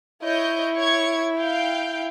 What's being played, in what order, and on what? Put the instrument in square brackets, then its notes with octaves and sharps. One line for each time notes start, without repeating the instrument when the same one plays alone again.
[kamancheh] E4 [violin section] C#5 D#5 G6
[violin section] C#5 C#6 G#6
F5 G5 G6